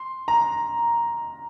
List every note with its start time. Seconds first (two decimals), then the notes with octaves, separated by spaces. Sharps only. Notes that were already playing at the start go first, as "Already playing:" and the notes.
Already playing: C6
0.28 A#5